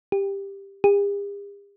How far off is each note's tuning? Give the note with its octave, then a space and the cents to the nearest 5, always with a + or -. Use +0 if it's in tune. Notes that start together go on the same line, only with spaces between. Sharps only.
G4 +10
G4 +45